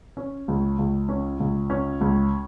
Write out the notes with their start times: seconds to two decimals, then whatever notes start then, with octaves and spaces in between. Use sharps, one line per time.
0.17 C#4
0.48 C#2
0.79 C#2
1.09 C#4
1.40 C#2
1.70 C#4
2.01 C#2